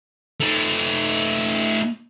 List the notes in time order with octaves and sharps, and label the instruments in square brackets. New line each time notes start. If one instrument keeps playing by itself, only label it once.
[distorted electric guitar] A3 D#4